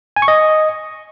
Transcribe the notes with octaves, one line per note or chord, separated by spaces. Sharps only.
G#5
C#6
D#5